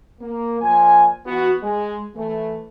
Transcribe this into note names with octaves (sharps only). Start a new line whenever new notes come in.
A#3
A#2 F3 G#5
E3 B3 F#4
G#3
E3 A3